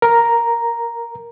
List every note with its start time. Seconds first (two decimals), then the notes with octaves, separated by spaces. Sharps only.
0.02 A#4 A#5